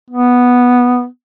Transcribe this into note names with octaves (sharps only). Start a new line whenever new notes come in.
B3